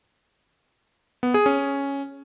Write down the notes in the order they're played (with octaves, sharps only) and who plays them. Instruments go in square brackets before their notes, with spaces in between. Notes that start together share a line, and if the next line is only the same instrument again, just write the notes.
[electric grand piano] B3
G#4
C#4